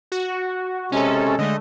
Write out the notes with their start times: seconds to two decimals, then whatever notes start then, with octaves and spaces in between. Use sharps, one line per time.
0.12 F#4
0.92 C3 G#3 C#4 A4
1.38 D3 G#3 A3 D#5